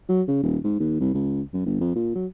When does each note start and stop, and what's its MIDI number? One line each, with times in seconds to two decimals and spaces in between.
0.09 0.22 54
0.28 0.42 49
0.43 0.58 27
0.64 0.78 44
0.80 0.98 39
1.00 1.12 36
1.14 1.41 37
1.53 1.62 42
1.66 1.78 31
1.80 1.91 41
1.95 2.10 46
2.15 2.26 54